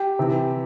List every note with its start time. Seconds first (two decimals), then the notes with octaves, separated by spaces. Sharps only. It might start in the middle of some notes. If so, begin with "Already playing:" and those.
Already playing: G4
0.19 C3 E3